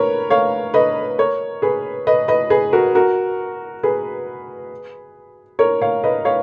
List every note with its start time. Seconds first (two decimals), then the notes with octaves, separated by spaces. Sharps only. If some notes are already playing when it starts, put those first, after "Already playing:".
Already playing: A#4 B4 C#5
0.30 C#5 F5
0.74 B4 D#5
1.19 A#4 C#5
1.62 G#4 B4
2.07 B4 D#5
2.28 B4 D#5
2.50 G#4 B4
2.73 F#4 A#4
2.95 F#4 A#4
3.83 G#4 B4
5.59 A#4 C#5
5.81 C#5 F5
6.04 B4 D#5
6.25 C#5 F5